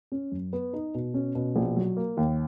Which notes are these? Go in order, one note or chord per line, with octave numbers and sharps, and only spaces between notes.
C#4
F#2
B3
D#4
B2
C#4
B2
A#1
F#3
A#3
D#2